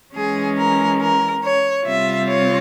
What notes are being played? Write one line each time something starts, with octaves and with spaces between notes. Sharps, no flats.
E3 G#3 C#4 G#4
A#4
A#4
C#5
C3 G3 C4 F4 E5
C#5